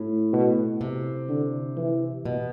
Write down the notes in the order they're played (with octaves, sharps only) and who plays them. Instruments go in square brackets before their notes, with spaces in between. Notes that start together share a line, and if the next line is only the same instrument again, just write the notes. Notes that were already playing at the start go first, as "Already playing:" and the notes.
Already playing: [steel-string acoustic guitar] A2
[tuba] B2
[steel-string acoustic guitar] C3
[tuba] D3
E3
[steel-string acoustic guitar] B2